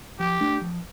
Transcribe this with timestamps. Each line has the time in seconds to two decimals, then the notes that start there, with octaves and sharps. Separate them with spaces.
0.20 F3 G4
0.41 A3 D4
0.61 F3